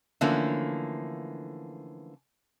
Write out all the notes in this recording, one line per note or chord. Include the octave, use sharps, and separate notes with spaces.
D3 E3 F3 A3 A#3 C#4